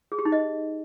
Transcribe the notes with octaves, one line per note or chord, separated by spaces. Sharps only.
G#4
G4
D#4
D#5